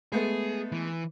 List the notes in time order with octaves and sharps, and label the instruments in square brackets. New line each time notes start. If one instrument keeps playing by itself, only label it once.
[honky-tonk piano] G#3 A3 B3 [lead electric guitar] G#4
[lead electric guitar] E3